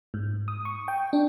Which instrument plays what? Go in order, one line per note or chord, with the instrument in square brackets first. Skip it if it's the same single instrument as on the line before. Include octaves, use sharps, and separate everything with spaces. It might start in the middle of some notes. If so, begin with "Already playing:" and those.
[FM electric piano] G#2
D#6
C#6
G5
D4